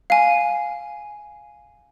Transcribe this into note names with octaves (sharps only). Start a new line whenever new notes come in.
F5 G#5